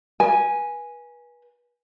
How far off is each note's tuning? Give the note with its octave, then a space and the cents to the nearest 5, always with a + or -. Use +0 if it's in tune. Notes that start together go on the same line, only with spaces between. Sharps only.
B4 -30 G#5 +0